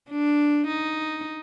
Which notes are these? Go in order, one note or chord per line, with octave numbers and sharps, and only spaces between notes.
D4
D#4